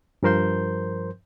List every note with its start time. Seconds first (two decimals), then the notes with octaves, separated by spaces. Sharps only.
0.23 G2 F3 A#4 C5 C6 G6